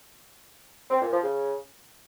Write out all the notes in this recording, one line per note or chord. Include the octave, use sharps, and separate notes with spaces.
C4
A#2
F3
C#3